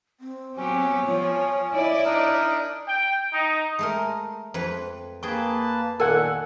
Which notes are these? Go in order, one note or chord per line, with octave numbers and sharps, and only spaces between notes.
C4
F#3 B3 C#4 G4
F3 C#5
E4 D5 D#5
D4 D#4 A#4
G5
D#4
G#3 A3 A#4
F2 B4
A#3 G#4 B4 G5 A5 C#6
A#2 D#3 A4 A#4 F#5 G#5 F#6